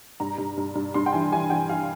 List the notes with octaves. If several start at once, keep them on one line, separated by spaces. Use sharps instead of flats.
G2 A#5
G2
G2
G2
G2 C6
G5
E3 G#5
E3 G#5
E3 G5
E3 F5